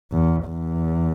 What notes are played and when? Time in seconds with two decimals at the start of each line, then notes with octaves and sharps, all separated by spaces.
0.12 E2
0.47 E2